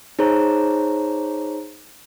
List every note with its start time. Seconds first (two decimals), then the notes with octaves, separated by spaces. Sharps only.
0.19 D#4 G#4 C5 C#5 A#5